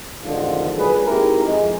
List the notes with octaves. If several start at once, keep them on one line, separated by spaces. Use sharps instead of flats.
A1 F2 G#2 D3 D#3 F3
A#2 F#3 G#3 G#4 B4
G#3 C4 D#4 E4 G4 A#4
F2 G#3